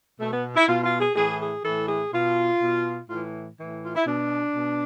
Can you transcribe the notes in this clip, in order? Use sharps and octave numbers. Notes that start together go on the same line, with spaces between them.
B2 A3
B3
E4
B2 F4
F4
G#4
A2 E3 G#4
G#4
A2 E3 A4
G#4
B2 F4
B2
A2 E3 F4
A2 E3
F4
E4
B2 D4
B2